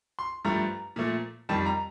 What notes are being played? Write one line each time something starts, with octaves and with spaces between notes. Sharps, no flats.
C6
G2 F3 A3 A#5
A#2 F3 A3
F2 D#3 G3 A5
A#5